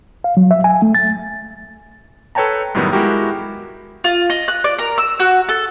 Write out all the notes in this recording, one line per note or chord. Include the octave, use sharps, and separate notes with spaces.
F5
F#3
E5
G#5
A3
A6
A4 B4 C#5 G5 A5 A#5
F#2 A2 D#3 F#3 G3 B3
G#3 E4 F#4 G4 A#4
F4
D#5
F#6
D5
A#4
E6
F#4
A4